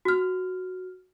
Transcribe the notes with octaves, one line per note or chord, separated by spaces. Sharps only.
F#4 F6